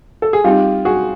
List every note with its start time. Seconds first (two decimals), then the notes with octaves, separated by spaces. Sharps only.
0.22 A4
0.33 G#4
0.44 G3 C4 D#4 F4 G4
0.85 F#4 G#4